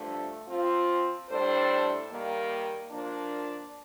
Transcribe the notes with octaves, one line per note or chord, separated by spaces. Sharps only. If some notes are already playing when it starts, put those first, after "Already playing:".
Already playing: G2 D3 F3 A3
F3 C4 F4
A2 G3 D4 A4 C5
D#3 G3 A#3
F3 A#3 D4